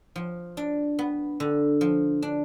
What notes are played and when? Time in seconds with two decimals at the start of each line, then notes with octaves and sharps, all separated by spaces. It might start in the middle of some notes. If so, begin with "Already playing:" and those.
0.16 F3
0.57 D4
0.99 B3
1.40 D3
1.81 F3
2.22 D4